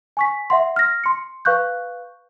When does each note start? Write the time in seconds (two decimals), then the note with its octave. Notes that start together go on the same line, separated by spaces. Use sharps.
0.17 G#5 C#6 B6
0.50 E5 F#5 C6
0.76 F6 A#6
1.04 C6 C#7
1.45 B4 F5 C#6 F#6 G6